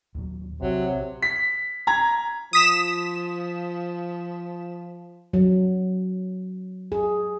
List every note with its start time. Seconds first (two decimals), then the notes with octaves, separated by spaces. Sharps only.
0.15 D#2 A#2 F#3
0.61 A#1 C3 F#3
1.22 B6
1.87 A#5 G#6
2.53 F3 D#6 B6 E7
5.33 F#3
6.92 G#4